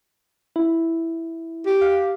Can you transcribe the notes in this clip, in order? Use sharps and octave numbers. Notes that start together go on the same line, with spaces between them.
E4
G4
F5